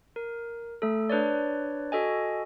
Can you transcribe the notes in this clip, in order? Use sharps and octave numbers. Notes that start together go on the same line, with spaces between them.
A#4
A3 A4
D4 B4 C#5 D5
F#4 A4 D#5 G#5